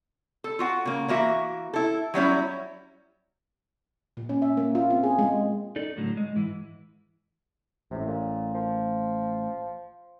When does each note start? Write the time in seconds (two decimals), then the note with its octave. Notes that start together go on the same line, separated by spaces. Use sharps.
0.44 A4
0.59 F4 F#4 F#5
0.85 C#3 A#3
1.08 E3 A#3 F#4 E5
1.74 E4 A4
2.14 F#3 G3 C#4 E4
4.17 A#2
4.29 C#4
4.42 E5
4.57 A#3
4.75 F4
4.90 C4
5.03 G#4
5.19 G#3
5.76 D#4 A4 D5
5.97 A2 D3 F#3
6.17 G#3
6.35 G#2 E3 E4
7.91 A1 A2 C3
8.06 A#2
8.54 F3